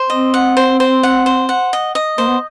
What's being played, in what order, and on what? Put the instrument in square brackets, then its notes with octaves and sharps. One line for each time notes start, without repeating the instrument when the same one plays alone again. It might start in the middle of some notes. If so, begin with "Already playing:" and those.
Already playing: [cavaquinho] C5
[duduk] C4 [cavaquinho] D#5
[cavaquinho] F#5
C5
C5
F#5
C5
F#5
D#5
D#5
[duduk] A#3 [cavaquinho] C5
[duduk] B3